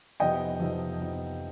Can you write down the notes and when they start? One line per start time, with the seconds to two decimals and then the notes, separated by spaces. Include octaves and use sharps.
0.20 F2 C3 F3 B3 D#4 D#5 G5
0.59 F2 C3 F3 B3 D#4
0.98 F2 C3 F3 B3 D#4